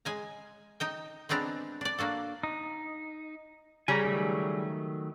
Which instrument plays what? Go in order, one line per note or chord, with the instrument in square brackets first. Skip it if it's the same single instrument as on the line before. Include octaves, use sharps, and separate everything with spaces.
[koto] G#3 G#5 A#5
D#4 D#5 G5
G#3 B3 C4 D4 A#5
D4 D5
A#3 D4 F#4 A4
[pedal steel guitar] D#4
[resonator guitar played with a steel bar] C#3 G3 C#4 [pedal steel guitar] G#5 A#5
[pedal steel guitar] D#3 F#3 A3